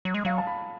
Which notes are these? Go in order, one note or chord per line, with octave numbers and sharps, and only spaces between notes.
F#3
G#3
F#3 F5
A5
B5